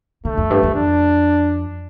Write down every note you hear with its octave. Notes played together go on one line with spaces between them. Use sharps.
D3 A3
F2
G2
F2
D4